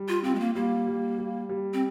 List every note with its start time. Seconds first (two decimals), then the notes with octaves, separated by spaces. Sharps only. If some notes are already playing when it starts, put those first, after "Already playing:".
Already playing: G3
0.08 F4
0.24 C4 F4
0.35 G#3
0.40 A#3
0.55 G3 A#3
0.87 G3
1.18 G3
1.49 G3
1.74 C4